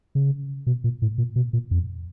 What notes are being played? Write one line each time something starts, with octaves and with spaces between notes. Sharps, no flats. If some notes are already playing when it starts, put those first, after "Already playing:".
C#3
B2
A#2
A2
A#2
B2
A#2
F2